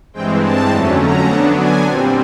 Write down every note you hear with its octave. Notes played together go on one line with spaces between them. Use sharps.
G2 E3 G#3 C4 G5
A5
F2 D3 F#3 A3 C#4
A#5
D3 F#3 B3 D4 A5
G#5
A#2 G3 C4